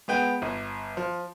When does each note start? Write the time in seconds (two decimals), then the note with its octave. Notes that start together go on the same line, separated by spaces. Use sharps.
0.08 G#3 B3 G5
0.42 G1
0.97 F3